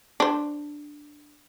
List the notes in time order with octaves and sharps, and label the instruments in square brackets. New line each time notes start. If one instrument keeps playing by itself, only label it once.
[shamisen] D4 C5